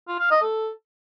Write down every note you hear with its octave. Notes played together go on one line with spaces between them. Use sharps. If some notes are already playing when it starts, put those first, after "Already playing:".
F4
F5
D#5
A4